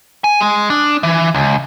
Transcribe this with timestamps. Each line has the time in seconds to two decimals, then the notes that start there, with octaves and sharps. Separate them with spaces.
0.24 G#5
0.41 G#3
0.70 D4
1.03 E3
1.35 C#2